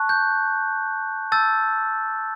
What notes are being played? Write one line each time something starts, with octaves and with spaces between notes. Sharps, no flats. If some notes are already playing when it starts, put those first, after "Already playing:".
Already playing: A5 C#6 F#6
G6
A5 E6 G6 A6